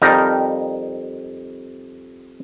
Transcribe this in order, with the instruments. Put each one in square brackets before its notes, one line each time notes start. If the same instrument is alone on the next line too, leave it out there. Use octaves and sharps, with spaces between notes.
[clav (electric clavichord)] F2 G3 D#4 A#4 A#5